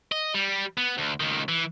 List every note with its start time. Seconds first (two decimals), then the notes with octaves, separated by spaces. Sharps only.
0.12 D#5
0.34 G3
0.78 B3
0.98 D2
1.20 C#2 D#3
1.49 E3